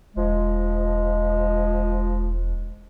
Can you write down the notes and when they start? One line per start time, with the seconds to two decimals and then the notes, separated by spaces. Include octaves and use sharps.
0.16 E1 F3 G#3